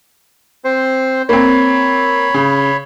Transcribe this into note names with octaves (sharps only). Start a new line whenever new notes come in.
C4 C5
A#3 C4 C#5 B5
C#3